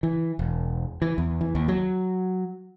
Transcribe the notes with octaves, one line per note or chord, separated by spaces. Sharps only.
E3
E1
E3
E2
E3
D#2
F#3